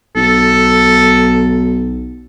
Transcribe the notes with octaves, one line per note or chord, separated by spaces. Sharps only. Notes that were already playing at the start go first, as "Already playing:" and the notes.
B1 A4